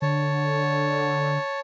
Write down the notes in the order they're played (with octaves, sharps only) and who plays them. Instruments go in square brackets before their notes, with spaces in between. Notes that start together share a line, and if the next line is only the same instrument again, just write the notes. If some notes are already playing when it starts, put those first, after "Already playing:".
[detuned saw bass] D3 [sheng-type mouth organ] C#5 A5